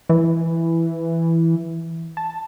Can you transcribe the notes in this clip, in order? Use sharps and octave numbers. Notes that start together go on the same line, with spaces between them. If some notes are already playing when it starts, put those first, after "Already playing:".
E3
A5